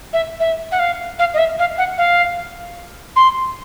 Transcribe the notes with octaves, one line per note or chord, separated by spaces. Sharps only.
E5
E5
F#5
F5
F5
D#5
E5
F5
F#5
F5
C6